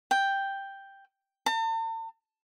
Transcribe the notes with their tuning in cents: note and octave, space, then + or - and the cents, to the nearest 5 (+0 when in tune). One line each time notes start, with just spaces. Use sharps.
G5 +5
A5 +45